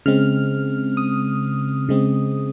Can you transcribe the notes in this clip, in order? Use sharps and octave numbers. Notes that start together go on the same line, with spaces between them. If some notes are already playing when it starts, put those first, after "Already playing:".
C#3 G#3 C4 F6
D#6
C#3 G#3 C4